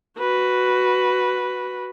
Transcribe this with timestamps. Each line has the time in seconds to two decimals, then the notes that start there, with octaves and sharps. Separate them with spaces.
0.19 F#4 B4